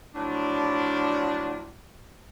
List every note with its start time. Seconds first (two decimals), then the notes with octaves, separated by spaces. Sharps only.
0.14 A2 F3 F#3 D4